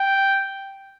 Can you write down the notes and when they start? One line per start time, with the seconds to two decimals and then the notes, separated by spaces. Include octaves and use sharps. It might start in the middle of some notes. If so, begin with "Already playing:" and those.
Already playing: G5